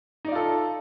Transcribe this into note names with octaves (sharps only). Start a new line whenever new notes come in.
D#4 F4 A4 D5